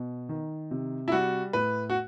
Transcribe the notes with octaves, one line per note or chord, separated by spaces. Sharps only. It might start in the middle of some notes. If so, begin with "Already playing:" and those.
Already playing: B2
D#3
C3
E4
G3 F#4
A2 B4
F#4